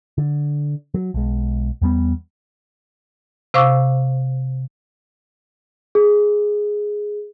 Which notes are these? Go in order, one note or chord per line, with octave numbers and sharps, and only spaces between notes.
D3
F#3
B1 G#3
E2 G3 B3
C3 C5 F5 C#6 D6 E6
G#4